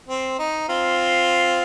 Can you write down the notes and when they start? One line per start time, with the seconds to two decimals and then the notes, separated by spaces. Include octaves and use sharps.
0.09 C4
0.39 D#4
0.69 C4 F4